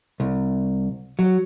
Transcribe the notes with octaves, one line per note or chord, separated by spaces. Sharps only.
C2
F#3